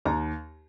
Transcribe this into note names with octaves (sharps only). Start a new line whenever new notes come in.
D#2 A#5